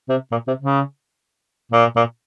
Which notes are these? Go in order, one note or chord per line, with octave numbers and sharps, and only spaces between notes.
C3
A#2
C3
C#3
A#2
A#2